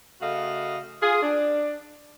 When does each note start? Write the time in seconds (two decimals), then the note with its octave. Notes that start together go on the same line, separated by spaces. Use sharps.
0.21 C#3 A3 F#4 D#5 F5
1.02 F4 G#4
1.22 D4